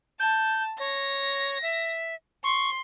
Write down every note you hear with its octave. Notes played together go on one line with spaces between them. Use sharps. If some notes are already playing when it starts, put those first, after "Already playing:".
A5 G6
C#5 A#6
E5
C6 C#6